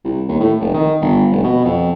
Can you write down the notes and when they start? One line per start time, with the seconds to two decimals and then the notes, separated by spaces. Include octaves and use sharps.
0.04 C2
0.29 D#2
0.40 A2
0.60 F1
0.74 D#3
1.01 G1
1.31 F1
1.44 B2
1.65 F2